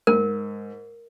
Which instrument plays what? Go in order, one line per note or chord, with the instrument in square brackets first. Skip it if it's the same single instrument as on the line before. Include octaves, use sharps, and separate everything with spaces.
[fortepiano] G#2 [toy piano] A#4